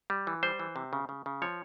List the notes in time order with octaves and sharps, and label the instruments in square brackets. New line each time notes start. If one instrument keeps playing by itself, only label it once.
[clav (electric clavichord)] G3
E3
G3 C5
E3
C3
C#3
C#3
C#3
F3 C#5